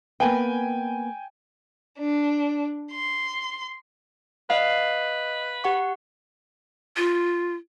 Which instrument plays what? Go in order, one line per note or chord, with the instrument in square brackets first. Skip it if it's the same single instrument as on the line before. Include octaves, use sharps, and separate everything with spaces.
[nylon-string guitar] A#3 B3 B4 [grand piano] G5 G#5
[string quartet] D4
C6
[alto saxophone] B4 [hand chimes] D#5 [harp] F5
[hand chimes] G4 F#5 C#6
[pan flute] F4